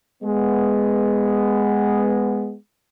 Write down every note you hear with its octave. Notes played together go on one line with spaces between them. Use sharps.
G#3 B3